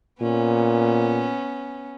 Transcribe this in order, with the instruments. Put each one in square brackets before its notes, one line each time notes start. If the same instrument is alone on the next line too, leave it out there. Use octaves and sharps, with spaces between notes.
[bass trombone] A#2 [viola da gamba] B3 C#4